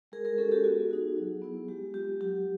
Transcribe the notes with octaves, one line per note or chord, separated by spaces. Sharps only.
G#3 G#4 A#4
G#4 A#4
C#4 F#4 G4 A4
G4 A4
B3 F#4 G#4
D#4 F#4
F#3
B3 E4
G#3 G4
C4 F4 G4
F#3 G4